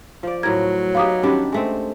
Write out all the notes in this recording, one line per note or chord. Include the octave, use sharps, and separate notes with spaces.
F3 D5
A2 F#3 A#4 G#6
B3 D#4 G4 F5 D6 D#6
D#3 G3 C#4 D4 G4 B5
G#3 A3 C4